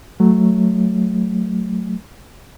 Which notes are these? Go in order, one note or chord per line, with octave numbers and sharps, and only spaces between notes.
F#3 A3